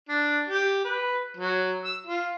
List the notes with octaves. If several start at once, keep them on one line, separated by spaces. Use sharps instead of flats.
D4
G4
B4
F#3
E6
F4